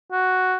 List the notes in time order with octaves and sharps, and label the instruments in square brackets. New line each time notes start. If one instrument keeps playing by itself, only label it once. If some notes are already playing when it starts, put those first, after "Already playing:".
[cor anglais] F#4